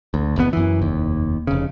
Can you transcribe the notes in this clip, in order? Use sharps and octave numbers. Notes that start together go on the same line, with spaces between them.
D2
F#1 E2 G#2 B3
F#2 E3
F1 D#2
F1 C#3